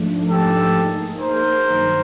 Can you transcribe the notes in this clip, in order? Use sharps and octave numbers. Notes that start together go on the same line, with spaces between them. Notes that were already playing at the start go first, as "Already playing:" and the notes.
Already playing: G#2 F3 A3 D4
G4 A4
A#3 D#4 G#4
A#4 C5
G2 D#3 F#3